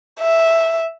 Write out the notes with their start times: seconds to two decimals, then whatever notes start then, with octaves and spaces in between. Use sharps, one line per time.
0.20 E5